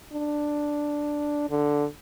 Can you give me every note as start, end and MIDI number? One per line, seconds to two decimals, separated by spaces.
0.13 1.46 62
1.50 1.85 50